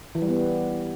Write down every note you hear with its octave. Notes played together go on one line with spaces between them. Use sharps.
E3
G3
B3